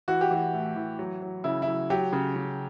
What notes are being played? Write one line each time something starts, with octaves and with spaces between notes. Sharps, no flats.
E3 F#4
G4
E3 F#4
A2
E3
F#3
F#3
C#3 E4
E4
F#3
F#3 G4
C#3
C#3